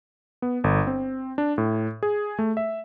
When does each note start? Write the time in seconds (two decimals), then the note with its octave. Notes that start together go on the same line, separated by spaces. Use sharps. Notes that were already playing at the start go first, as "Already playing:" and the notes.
0.42 B3
0.64 G1
0.87 C4
1.38 D4
1.58 A2
2.03 G#4
2.39 A3
2.57 E5